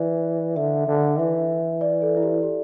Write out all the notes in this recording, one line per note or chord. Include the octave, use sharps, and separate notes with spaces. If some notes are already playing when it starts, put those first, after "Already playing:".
Already playing: E3 D5
D3 E5
D3
E3 E5
D5
A4
E4
G4
G4